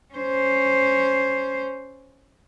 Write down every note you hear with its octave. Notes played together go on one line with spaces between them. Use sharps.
C#4 C5